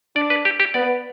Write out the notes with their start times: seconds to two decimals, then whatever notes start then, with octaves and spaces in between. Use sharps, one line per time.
0.16 D4 D5
0.30 B4
0.45 G4
0.60 G4
0.74 B3 D5